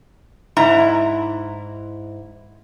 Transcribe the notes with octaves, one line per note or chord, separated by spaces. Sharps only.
G#2 E4 A#5